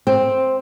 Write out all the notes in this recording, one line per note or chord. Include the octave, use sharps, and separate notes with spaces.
C4